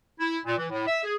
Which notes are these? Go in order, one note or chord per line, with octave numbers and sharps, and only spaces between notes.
E4
A#2
E3
A2
E5
G#4